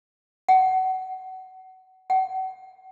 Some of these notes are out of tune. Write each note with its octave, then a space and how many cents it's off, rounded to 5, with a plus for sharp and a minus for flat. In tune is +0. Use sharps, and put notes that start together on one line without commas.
F#5 +25
F#5 +35